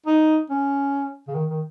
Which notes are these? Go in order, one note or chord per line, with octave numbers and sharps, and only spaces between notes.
D#4
C#4
C#3
D#3
D#3